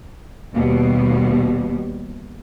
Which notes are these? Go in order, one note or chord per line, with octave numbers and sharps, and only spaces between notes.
D#2 B2 G3